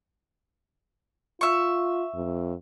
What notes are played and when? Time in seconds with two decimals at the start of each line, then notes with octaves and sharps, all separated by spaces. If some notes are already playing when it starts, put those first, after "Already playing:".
1.41 F4 E5 C#6
2.15 F2